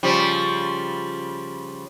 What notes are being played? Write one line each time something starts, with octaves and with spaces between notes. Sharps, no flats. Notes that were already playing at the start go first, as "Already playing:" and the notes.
C#3 F3 G3